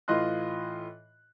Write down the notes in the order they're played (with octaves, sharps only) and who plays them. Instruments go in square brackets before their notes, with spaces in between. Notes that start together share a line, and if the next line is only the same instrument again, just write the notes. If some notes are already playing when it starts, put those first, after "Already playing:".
[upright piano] A2 E3 F4 D#5 C6 F#6